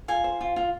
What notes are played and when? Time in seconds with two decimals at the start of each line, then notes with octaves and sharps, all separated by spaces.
0.08 F4 G#5
0.24 C5
0.41 F4
0.56 F4